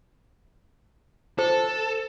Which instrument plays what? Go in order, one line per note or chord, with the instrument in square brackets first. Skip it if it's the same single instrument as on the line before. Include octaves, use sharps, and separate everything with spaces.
[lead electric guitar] A4 [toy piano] C5